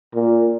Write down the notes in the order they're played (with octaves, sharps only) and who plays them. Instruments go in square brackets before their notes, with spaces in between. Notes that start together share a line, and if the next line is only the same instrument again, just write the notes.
[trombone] A#2